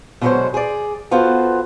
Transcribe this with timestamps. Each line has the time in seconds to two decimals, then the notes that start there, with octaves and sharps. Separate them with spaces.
0.21 B2 D3 F#3 G#3 F#4 C5
0.54 G#4 D5
1.11 B3 F4 F#4 A4 C5